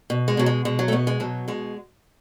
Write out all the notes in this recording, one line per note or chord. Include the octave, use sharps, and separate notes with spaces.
B2
G#3
B2 F#3
G#3
B2 G#3
F#3
A3
B2 B3
G#3
B2 F#3
B2 G#3